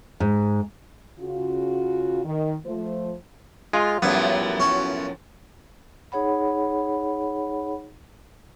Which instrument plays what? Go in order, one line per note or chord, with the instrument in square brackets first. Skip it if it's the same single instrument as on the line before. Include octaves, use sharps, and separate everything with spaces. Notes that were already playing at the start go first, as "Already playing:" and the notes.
[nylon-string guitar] G#2
[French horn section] C#3 F4 F#4
D#3
F3 A3 C5
[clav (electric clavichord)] G#3 [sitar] F4
[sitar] F#2 A2 F3 [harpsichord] G3 E4 [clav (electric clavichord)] B3
[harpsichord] C#4 F#4
[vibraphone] D#4 G#4 C#5 F#5 B5